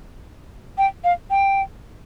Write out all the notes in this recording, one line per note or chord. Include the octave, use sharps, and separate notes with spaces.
G5
F5
G5